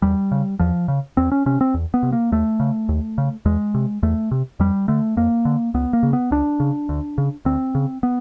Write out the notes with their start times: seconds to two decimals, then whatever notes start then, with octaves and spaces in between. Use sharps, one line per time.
0.02 E2 G3
0.32 C#3
0.59 E2 F3
0.88 C#3
1.17 E2 C4
1.32 C#4
1.46 C3 C#4
1.61 C4
1.74 E2
1.94 B3
2.03 C3
2.12 A#3
2.32 D#2 A3
2.60 C#3
2.89 D#2
3.18 C#3
3.45 E2 G#3
3.74 C3
4.03 E2 A3
4.31 C3
4.60 F2 G3
4.88 D3 A3
5.17 F2 A#3
5.45 D3
5.74 C#2 B3
5.93 A#3
6.03 C#3
6.13 B3
6.31 C#2 D4
6.60 C#3
6.89 D2
7.18 C#3
7.45 D2 C4
7.75 C#3
8.03 B3